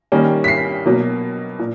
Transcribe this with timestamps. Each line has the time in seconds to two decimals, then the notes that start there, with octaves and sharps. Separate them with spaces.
0.12 D#3 G3 A#3 C#4
0.44 B6
0.48 C7
0.86 B2 F#3 A#3
1.59 A#2